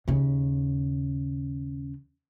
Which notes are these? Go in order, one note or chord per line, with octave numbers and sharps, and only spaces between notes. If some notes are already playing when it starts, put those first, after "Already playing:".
D#2 C#3